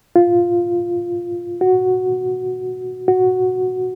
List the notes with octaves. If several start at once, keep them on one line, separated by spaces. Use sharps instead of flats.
F4
F#4
F#4